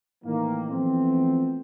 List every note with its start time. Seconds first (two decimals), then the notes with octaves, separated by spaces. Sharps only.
0.24 A2 D#3 E3 A#3
0.69 E3 F3 A3 B3 C4